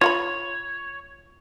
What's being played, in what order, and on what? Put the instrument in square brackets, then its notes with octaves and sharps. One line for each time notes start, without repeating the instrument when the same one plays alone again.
[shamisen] F4 F#5 B5 [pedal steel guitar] C#5